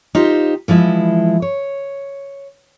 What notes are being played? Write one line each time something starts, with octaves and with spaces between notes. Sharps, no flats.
D#4 F4 G4 C5
E3 F3 G#3 E4
C#5